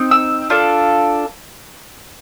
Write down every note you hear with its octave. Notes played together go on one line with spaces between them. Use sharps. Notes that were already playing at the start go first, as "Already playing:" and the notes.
Already playing: C4 D#4
E6
D4 F4 A4